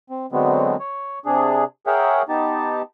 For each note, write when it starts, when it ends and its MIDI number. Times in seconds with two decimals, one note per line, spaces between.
0.10 0.26 60
0.32 0.76 50
0.32 0.76 54
0.32 0.76 56
0.32 0.76 59
0.32 0.76 60
0.80 1.19 73
1.26 1.64 48
1.26 1.64 62
1.26 1.64 68
1.87 2.22 68
1.87 2.22 70
1.87 2.22 73
1.87 2.22 76
1.87 2.22 78
1.87 2.22 79
2.29 2.82 59
2.29 2.82 63
2.29 2.82 67
2.29 2.82 81